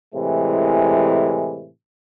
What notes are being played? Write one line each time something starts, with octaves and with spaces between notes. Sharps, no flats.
A2 C3 E3 G#3